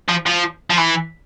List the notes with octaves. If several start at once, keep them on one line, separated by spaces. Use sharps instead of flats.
F3
F3
F3
E3